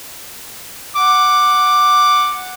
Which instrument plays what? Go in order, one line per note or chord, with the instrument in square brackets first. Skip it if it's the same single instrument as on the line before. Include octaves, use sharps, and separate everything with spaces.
[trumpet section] F#5 D6